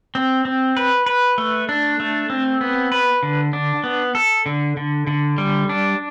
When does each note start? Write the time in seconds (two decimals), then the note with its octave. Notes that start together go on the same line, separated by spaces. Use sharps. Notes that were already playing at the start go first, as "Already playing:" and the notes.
0.15 C4
0.45 C4
0.77 B4
1.06 B4
1.38 A3
1.69 D4
2.00 A3
2.30 C4
2.61 B3
2.92 B4
3.23 D3
3.53 D4
3.84 B3
4.15 A4
4.46 D3
4.77 D3
5.07 D3
5.38 G3
5.69 D4